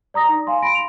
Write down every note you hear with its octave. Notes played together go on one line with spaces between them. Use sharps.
D5 A#5 D#6 A#6
D#4
F5 G#5 C6
B5 C6 A#6 D7
F7